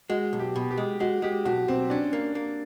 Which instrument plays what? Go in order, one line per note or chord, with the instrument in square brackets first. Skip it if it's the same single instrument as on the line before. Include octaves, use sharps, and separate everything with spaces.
[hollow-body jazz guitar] G#3 [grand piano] F#4
[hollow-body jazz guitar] B1
[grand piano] G4
[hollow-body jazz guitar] B2
[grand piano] G4
[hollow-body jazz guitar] G#3
[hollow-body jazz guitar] G#3 [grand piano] F#4
[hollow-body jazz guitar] G#3 [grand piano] G4
[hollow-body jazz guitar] B1 [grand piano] F#4
[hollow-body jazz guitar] B1 [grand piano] C4
[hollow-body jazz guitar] C#4 [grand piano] D4
[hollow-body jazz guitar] A#3
A#3